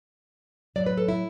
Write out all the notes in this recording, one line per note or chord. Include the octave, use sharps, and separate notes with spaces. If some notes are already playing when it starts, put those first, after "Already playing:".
A2 F#3 D5
B4
A4
E4